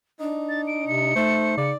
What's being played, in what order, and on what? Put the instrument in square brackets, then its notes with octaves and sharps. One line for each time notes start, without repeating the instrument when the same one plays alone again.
[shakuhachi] D4 [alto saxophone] D#4
[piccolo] A6
D7
[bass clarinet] C3 [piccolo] C#7
[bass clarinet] A3 [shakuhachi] D#4 [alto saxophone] C5
[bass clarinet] C#3 [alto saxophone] D5